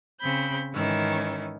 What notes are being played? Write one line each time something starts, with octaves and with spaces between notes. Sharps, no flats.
C#3 C4 B5 G6
G#2 D#3 E3 C#4